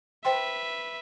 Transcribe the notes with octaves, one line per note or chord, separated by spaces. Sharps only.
B4 C5 E5 G5 C6